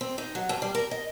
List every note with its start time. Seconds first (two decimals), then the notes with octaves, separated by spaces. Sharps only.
0.01 C4
0.18 D#4
0.35 F#3
0.49 F2
0.62 G3
0.75 A#4
0.91 D#5